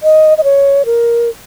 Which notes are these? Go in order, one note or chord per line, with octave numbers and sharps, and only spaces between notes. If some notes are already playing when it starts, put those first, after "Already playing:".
D#5
D#5
C#5
A#4